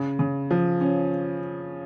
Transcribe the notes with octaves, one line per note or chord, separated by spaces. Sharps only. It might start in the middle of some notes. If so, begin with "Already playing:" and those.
Already playing: C#3
C#3
F3
C#4